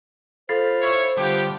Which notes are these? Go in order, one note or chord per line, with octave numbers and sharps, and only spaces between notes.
F4 A4 C5 B5 A6 C7
E4 C#5
D3 G3 B3 F4 G4